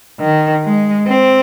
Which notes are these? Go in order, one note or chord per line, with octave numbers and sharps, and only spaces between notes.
D#3
G#3
C4